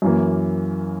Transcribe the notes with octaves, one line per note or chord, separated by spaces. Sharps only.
F#2 E3 A#3